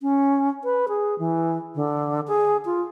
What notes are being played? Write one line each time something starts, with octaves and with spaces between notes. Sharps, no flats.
C#4
B4
G#4
E3
D3
G#4
F4